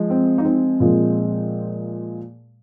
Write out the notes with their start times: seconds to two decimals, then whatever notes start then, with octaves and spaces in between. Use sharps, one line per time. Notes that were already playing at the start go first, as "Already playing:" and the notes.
Already playing: F3 G#3
0.10 C4
0.38 D#4
0.45 C4
0.80 A#2 F3 G#3